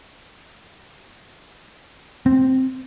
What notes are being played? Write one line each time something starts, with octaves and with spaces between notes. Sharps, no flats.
C4